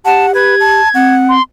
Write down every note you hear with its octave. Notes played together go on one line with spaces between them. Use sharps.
G4 F#5 A5
B4 G#6
A5
C4 F#5
C6